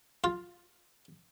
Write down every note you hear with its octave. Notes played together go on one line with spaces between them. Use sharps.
F4